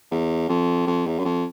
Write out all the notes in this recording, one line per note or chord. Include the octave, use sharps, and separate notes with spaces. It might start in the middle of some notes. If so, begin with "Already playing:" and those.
E2
F2
F2
E2
F#2
F2